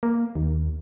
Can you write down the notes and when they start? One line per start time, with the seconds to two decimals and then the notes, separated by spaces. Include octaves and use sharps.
0.03 A#3
0.35 D#2